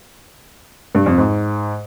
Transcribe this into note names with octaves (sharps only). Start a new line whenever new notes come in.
G2
F2
G#2